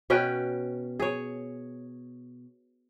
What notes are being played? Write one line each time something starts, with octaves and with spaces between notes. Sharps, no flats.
B2 C#4 B4 G5
G#4 C#5